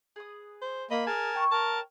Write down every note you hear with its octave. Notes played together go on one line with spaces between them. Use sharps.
G#4 B4 D#6
C5
A#3 D#5 B5
D#4 G#4 A#4 G#5 A5
C#5 G5 C#6
A#4 A5